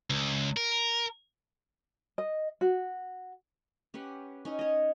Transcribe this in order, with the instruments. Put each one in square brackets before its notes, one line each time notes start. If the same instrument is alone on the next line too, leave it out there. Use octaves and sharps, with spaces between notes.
[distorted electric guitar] C#2
A#4
[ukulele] D#5
F#4
[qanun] C#4 G4 B4 F#5
C#4 D#4 C#5
C#5 D#5